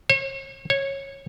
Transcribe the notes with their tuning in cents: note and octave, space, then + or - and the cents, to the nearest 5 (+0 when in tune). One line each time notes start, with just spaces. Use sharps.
C#5 -40
C#5 -15